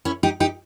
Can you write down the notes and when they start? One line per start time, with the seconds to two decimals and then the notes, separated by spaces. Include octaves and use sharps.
0.05 C#4 E4
0.23 D#4 G4
0.40 D#4 G4